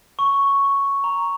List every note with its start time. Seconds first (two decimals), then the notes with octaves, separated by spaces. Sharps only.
0.19 C#6
1.04 A#5